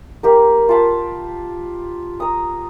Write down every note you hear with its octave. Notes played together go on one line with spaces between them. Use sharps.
A#3 G4 A#4
F4 G5 A5 B5
A#5 D#6